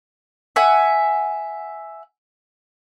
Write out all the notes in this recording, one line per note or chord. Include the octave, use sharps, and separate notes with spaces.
E5 F#5 G#5